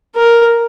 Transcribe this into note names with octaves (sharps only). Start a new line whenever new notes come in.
A#4